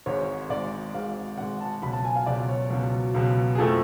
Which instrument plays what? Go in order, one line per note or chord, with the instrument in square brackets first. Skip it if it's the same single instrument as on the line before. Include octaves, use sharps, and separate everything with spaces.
[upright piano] G#1 G#2 G#3 C#5
G#1 G#2 G#3 D5
G#1 G#2 G#3 F5
G#1 G#2 G#3 F#5
A5
C#2 B2 F#3 B5
A5
G#5
F5
C#2 B2 F#3 D5
C#5
C#2 B2 F#3
C#2 B2 F#3
G#4
F2 F3 A3 A4